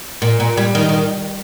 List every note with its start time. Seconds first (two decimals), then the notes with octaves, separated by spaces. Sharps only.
0.22 A#2
0.40 A#2
0.57 G3
0.75 D#3
0.89 D#3